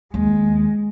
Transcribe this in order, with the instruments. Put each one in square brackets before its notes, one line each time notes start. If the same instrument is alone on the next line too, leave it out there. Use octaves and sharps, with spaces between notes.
[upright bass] D#2 [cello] G#3